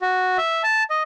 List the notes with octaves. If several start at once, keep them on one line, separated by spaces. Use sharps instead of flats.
F#4
E5
A5
D#5